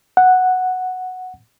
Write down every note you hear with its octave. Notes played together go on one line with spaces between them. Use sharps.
F#5